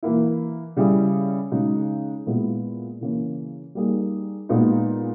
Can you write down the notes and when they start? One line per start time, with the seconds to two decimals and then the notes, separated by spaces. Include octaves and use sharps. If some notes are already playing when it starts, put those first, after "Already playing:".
0.03 E3 A#3 E4
0.76 C#3 G3 C#4 E4 G#4
1.52 C#3 G#3 D#4
2.26 A#2 G#3 B3 E4
3.01 C#3 E3 A#3 C#4
3.75 G3 A#3 D#4 G#4
4.49 A#2 G#3 B3 D#4